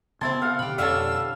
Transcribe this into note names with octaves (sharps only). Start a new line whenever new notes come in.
C#3 B3 C4 E4 A5 C6
F5 F#5
B2 D3 G4 B5
F2 B2 D3 G3 C#4 F5 A5 E6